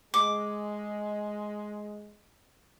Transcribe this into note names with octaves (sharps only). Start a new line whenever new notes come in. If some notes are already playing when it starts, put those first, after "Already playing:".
G#3 D6